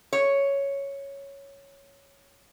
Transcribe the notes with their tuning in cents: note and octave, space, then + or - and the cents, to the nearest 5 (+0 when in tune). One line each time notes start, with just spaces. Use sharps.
C#5 +0